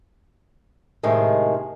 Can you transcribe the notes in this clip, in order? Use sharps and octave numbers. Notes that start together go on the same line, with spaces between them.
A2 C3 D#3 G#3